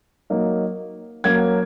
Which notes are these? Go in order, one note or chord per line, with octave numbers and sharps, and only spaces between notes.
F#3 A#3 D#4
F#3 A#3 C#4 G#6